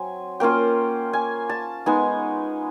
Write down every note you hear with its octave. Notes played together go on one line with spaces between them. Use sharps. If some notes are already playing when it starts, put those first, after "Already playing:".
Already playing: F#3 C4 G#5
A#3 C#4 F4 G5
G#5
A5
G#3 B3 D#4 G#5